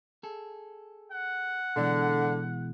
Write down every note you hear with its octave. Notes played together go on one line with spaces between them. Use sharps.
G#4 A4
F#5
B2 D3 E3 G#3